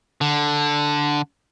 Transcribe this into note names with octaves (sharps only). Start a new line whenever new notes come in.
D3